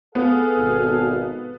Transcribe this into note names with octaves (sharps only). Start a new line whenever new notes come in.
B3 G#4 A4 F5
G#1 B2